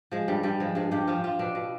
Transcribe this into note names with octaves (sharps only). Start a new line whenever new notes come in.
F3 G#3
G2 G3
G2 G3
F3 G#3
G2 G#3
G2 G4
F3 F4
F3 F4
B2 D4
B2